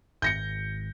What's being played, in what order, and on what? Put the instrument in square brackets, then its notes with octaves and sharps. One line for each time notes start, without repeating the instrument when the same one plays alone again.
[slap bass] G#1 [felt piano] G6 A#6 C#7